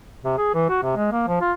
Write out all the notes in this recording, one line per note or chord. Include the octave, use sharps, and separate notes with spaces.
C3
G#4
E3
F#4
C3
G#3
A#3
F3
F4